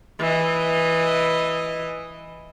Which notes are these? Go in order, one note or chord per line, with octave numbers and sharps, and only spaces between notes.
E3 D#5